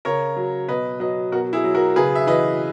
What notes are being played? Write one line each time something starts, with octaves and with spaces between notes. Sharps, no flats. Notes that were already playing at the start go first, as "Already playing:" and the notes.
C#3 A#4 C#5
F#3
B2 B4 D#5
F#3 B4 D#5
B2 F#4 A#4
E4 G#4
F#3
F#4 A#4
C#3 G#4 B4
E5
E3 B4 D#5